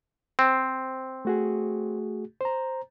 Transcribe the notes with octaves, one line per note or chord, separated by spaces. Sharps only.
C4
A3 F#4 G#4
C5 A#5